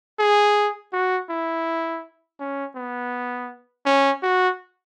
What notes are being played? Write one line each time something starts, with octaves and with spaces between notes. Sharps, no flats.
G#4
F#4
E4
C#4
B3
C#4
F#4